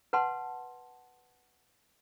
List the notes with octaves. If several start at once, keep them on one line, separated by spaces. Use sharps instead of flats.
B4 F#5 A5 C6